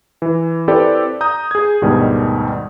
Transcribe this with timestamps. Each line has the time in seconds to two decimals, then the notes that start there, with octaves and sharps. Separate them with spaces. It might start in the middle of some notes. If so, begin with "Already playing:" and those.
0.22 E3
0.68 C4 E4 G4 A4 B4 D5
1.21 A#5 D#6 G6
1.51 G#4 G#6
1.81 D2 G#2 B2 D#3 G3